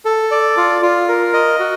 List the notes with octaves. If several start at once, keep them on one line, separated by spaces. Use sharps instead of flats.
A4
D5
F4
F4
A#4
D#5
F#4